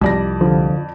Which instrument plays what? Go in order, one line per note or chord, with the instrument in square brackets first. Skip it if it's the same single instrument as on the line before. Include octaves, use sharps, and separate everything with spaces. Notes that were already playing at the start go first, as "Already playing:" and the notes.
[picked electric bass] C2 G3 [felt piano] F2 D5 A#6
[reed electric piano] D3 F3